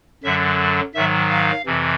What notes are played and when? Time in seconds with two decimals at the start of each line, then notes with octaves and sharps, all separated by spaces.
0.24 F#2 D3 F#3 E5
0.94 G#2 D#3 F#3 E5
1.30 F5
1.66 F2 C3 E3